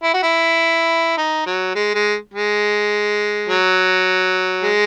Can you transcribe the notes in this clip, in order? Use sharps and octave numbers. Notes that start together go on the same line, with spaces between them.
E4
F#4
E4
D#4
F#3
G#3
G#3
G#3
F#3
G#3